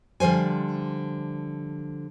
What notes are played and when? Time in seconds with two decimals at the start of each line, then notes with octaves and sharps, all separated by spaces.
0.20 D3 F3 G3 C5 G#5